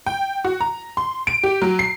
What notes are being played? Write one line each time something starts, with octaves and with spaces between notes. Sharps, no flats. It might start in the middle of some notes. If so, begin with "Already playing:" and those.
G5
F#4
A#5
C6
D7
G4
F#3
C7